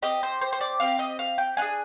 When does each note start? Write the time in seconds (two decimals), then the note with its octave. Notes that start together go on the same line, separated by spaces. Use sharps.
0.02 C4 G4 D#5
0.23 C5
0.41 C5
0.52 C5
0.61 D5
0.80 C4 G4 F5
0.99 D#5
1.19 F5
1.38 G5
1.57 D4 F4 G#5
1.61 G#4